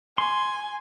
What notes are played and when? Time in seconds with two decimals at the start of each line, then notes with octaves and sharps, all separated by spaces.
0.18 G#5 C6